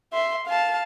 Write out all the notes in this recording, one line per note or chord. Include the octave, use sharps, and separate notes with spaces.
E5 C6
F5 A5